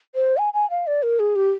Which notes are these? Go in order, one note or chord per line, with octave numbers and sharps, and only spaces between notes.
C5
G#5
G#5
F5
D5
A#4
G#4
G4